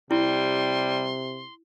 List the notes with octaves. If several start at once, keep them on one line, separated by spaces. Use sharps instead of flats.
C3 G3 E4 C6